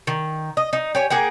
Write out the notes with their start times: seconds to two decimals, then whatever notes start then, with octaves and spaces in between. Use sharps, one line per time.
0.07 D#3
0.57 D#5
0.73 D#4
0.95 G4 C#5 G#5
1.10 A#3 G#4 F#5 G5